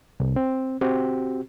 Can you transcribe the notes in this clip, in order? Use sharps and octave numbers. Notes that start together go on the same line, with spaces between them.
C2
C4
C4 F#4 G4